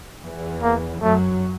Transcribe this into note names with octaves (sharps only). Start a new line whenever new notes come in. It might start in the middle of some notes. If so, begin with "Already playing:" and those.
E2 E3
A#3
F#2 F#3 A3